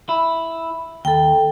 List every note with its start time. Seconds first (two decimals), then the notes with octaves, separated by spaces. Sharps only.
0.09 E4
1.05 D#2 A4 G5